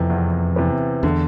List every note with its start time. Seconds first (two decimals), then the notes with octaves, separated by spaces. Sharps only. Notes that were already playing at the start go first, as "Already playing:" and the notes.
Already playing: F2 C3 E3 B3
0.10 E2
0.56 C3 E3 B3
1.03 E2 D3